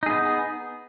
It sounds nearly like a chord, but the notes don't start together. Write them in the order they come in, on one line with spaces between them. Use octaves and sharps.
D#4 G#4 B3